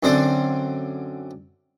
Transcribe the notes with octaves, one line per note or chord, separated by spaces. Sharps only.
F#2 D3 C4 C5 D5